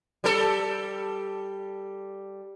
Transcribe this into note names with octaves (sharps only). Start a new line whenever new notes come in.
G3 A4